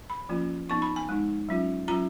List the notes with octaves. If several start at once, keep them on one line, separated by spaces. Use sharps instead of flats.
B5
F3 A#3 C#4 F4
F3 B3 D#4 C#6
B5
G#5
G#3 D#4
F#3 C#4 F4
F#3 C#4 F4 A#5